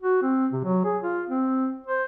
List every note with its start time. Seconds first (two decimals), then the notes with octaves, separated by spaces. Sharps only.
0.02 F#4
0.22 C4
0.53 C3
0.64 F#3
0.85 G#4
1.03 F4
1.29 C4
1.87 C5